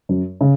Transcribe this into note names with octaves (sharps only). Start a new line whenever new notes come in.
F#2
C#3